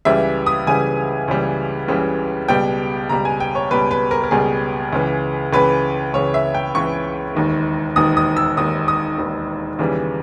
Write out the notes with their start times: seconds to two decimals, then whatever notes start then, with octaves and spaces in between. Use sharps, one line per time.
0.05 C#2 C#3 E3 G3 E5
0.46 D#6
0.67 C#2 C#3 E3 G3 G#5
1.28 C#2 C#3 E3 G3
1.88 C#2 C#3 E3 G3
2.49 C#2 B2 G3 G5
3.09 C#2 B2 G3 A#5
3.25 G#5
3.40 G5
3.55 C#5
3.71 C#2 B2 G3 B4
3.91 B4
4.11 A#4
4.23 A#4
4.31 C#2 B2 G3 G#4
4.93 C#2 C#3 E3
5.53 C#2 C#3 E3 B4
6.13 C#2 C#3 E3 C#5
6.34 E5
6.54 G5
6.75 C#2 C#3 E3 C#6
7.35 E1 D#2 D#3
7.96 E1 D#2 D#3 D#6
8.17 D#6
8.37 E6
8.57 E1 D#2 D#3 D#6
8.88 D#6
9.18 E1 D#2 D#3
9.79 D#2 C#3 E3 G3